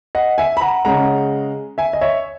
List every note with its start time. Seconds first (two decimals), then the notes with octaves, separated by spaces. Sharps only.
0.15 D#5 F#5
0.38 E5 G#5
0.57 B5
0.61 F#5 A#5
0.85 C#3 G#3 F#5 A#5
1.78 E5 G#5
1.93 D#5
2.01 C#5 E5